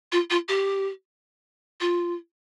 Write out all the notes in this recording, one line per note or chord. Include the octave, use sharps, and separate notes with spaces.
F4
F4
G4
F4